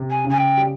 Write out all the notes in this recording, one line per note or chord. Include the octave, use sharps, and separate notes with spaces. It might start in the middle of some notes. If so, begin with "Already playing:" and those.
Already playing: C3
G#5
C#3 G#5
G5
G3